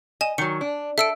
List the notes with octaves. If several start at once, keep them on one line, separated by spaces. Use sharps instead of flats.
D#5 G#5 E7
D#3 F#3 C#7
D4
A4 E5 E6 D7